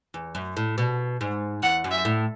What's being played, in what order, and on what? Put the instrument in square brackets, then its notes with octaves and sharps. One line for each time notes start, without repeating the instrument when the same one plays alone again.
[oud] E2
F#2
A2
B2
G#2
[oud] E2 [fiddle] F#5
[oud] F#2
[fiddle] E5
[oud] A2